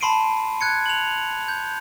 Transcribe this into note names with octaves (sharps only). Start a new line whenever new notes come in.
A5 B5 C6 C7 D7 D#7
F#6 G#6 C#7
F7 F#7
G6